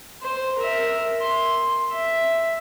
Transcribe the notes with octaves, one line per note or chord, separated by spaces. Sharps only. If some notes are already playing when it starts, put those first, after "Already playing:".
C5
A#4 E5
C6
E5